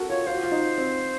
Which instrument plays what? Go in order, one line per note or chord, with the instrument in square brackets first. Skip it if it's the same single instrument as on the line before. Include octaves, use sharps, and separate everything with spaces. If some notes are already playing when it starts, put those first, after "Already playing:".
Already playing: [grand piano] F#4 A4 A#4
[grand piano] F4 [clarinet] C#5
[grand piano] F4 [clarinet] C5
[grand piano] F#4
F4
D#4
C4